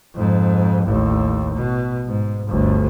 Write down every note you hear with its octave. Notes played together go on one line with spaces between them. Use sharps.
F2 G#2
A1 D#2
B2
G#2
G1 D2